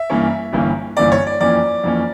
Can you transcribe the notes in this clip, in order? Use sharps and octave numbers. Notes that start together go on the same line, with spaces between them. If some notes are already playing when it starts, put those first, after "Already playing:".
Already playing: E5
G2 E3 A#3 C#4
G1 G2 E3 A#3 C#4
G1 G2 E3 A#3 C#4 D5
C#5
D5
F2 E3 A#3 C#4 D5
F2 E3 A#3 C#4